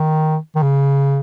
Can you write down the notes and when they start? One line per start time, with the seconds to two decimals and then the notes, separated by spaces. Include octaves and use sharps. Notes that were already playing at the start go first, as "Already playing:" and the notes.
Already playing: D#3
0.55 D#3
0.63 C#3